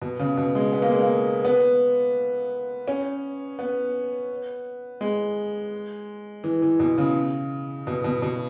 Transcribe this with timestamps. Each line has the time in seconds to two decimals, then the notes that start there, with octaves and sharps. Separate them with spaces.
0.02 B2
0.19 C#3
0.37 B2
0.55 G#3
0.73 B3
0.82 A#3
0.90 G#3
1.00 A#3
1.45 B3
2.88 C#4
3.59 B3
5.01 G#3
6.44 E3
6.62 E3
6.80 B2
6.98 C#3
7.87 B2
8.04 B2
8.22 B2